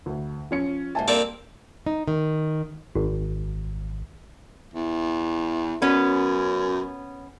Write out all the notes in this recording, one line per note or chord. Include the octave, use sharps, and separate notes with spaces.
D2
F3 C#4 C#7
G#2 C3 A#3 E5 G#5 A5
G3 A#3 C4 D4 A4 A#4
D#4
D#3
G#1
E2
F#2 B3 C#4